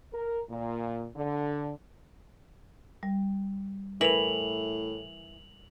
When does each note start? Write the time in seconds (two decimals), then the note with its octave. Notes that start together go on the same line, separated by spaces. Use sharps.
0.12 A#4
0.49 A#2
1.15 D3
3.03 G3
4.01 A2 E3 A#4 F7 F#7